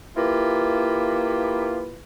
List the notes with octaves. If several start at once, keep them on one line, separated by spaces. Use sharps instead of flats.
A#3 E4 F4 G4 B4